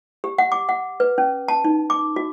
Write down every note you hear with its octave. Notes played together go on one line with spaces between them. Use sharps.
G4
F#5
D6
F#5
B4
C#4
A5
D#4
D6
F#4